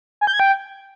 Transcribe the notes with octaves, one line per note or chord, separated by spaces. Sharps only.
G#5
G6
G#6
G5